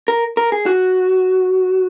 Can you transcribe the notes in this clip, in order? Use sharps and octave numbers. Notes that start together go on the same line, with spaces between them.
A#4
A#4
G#4
F#4